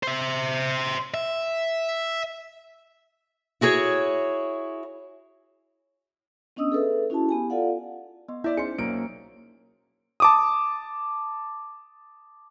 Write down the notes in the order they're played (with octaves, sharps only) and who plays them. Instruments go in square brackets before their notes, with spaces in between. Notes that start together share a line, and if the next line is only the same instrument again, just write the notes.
[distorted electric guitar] C5 E5
E5
[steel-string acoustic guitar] E4 F#4 G#4 C#5
[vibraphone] B3 C#4 D4 D#5 D#6 E6
G#4 A4 B4 E5
C#4 E4 F#4 G#4 A5
B3 G4 G#5
F4 A4 D5 F5 F#5
[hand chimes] B3 D#5 C6
[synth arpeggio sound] E4 [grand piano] D5 E5 [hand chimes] G6
[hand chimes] C#4 D#4 C5 [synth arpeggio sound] G#4 C6 [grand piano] C#7
[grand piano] B1 A#3 D7
[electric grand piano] A5 D6 D#6